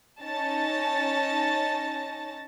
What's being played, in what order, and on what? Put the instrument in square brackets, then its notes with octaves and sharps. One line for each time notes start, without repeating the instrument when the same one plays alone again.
[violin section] C#4 D#4 A5 A6 A#6